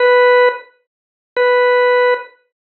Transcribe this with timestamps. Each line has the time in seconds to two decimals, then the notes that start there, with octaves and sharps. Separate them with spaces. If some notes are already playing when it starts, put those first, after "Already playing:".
Already playing: B4
1.37 B4